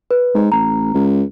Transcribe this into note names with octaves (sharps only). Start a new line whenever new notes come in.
B4
G#2
A1 A#5
C#2